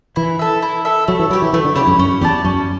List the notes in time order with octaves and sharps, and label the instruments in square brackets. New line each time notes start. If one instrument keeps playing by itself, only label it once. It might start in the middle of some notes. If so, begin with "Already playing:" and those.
[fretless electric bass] E3 [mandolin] E4
[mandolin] A4 E5
E4
A4 E5
[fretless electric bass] F#3 [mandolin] A3
[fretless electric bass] E3
[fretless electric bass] F#3 [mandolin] E4 G4 C#5
[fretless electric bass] E3
[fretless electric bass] E3 [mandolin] A3
[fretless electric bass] D3
[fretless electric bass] C#3 [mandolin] E4 G4 C#5
[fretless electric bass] F#2
[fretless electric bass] F#2 [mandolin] C#4
[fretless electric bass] E2 [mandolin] G4 D5 A5
[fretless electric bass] F#2 [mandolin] C#4